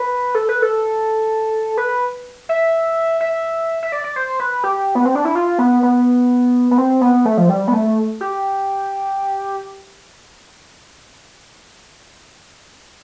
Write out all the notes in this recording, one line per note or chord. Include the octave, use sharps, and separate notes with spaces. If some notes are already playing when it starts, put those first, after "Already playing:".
Already playing: B4
A4
B4
A4
B4
E5
E5
E5
D5
D5
C5
B4
G4
B3
C4
D4
E4
F4
B3
B3
B3
C4
B3
A3
F3
G3
B3
A3
G4